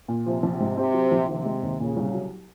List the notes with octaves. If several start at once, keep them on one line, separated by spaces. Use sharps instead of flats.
A#2
C3 F3
A#1
G#2
C3 C4
F#3
A#1
C3 D#3
G#3
D#2
A#2 C#3
C2
F#3